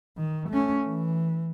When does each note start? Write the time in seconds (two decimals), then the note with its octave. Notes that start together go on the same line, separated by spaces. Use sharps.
0.17 D#3
0.50 A3 C#4
0.86 E3